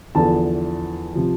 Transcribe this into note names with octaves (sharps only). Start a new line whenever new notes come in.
E2 D3 F3 A5
C3 F3